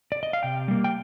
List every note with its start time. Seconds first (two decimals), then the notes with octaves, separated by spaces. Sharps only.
0.12 D5
0.23 D#5
0.33 F5
0.43 C3 G5
0.68 G3 A#3
0.84 G5